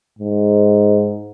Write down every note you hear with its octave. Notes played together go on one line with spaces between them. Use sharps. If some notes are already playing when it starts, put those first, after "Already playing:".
G#2